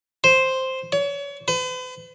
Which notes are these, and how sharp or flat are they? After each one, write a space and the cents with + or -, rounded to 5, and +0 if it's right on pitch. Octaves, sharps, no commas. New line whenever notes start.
C5 +0
C#5 +35
B4 +45